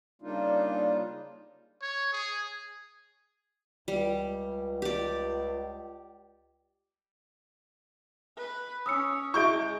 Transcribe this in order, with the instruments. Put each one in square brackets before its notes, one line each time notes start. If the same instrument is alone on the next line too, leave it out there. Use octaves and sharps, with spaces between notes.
[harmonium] C#3 G3 A#3 D4 D#4 F4
[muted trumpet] C#5
G#4
[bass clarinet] C#2 [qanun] G3
[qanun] G4 D5
[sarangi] B4
[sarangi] C#4 [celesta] D#6 E6 C#7
[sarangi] G#3 [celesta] E4 G#4 E5 [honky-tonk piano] C#6 G6 D7